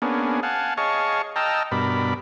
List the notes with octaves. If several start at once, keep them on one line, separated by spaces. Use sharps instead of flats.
A#3 B3 C#4 D4 G#4
F5 F#5 G#5 A5
G#4 C#5 D#5 F5 A5 C#6
D#5 G5 A5 A#5 E6 F6
G2 B2 A#4 D5 B5